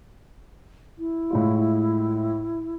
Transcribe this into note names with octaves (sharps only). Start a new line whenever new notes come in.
E4
A2 G#3 F4